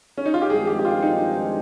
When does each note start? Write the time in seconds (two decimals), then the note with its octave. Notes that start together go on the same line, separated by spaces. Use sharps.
0.18 C#4
0.26 D#4
0.34 F4
0.42 G4
0.50 G#1 G2 F3 G#3 G#4
0.67 G4
0.79 G4
0.85 F4
1.02 D#4